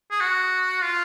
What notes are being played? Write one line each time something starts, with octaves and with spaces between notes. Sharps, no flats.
G#4
F#4
F4